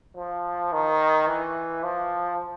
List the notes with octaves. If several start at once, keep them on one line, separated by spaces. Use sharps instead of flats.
F3
D#3
E3
F3